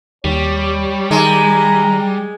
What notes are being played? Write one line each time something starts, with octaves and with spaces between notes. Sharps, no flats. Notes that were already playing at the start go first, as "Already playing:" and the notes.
D#2 G3 C#5
D#3 G#3 A#5